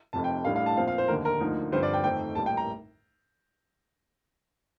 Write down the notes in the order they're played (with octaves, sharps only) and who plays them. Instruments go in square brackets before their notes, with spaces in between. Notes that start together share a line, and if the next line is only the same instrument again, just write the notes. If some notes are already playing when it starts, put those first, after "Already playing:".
[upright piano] F1 F2 C3 A5
G5
A1 A2 G3 D4 F5
F5
A5
A#2 F3 C4 F4 F5
F5
C5
F1 D#2 D3 A#4
A#4
D2 D3 F3 A#3 D#4
G2 D3 F3 C4 C5
D5
G5
F2 D#3 A3 C4 D#4 G5
A#1 A2 G3 A5
G5
A#5